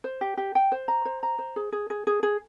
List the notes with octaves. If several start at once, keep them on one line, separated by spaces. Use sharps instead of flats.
C5
G4
G4
G5
C5
A#5
C5
A#5
C5
G#4
G#4
G#4
G#4
G#4